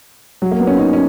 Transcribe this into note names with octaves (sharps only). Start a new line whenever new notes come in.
F#3
A#3
B3
C#4
D#4
C#4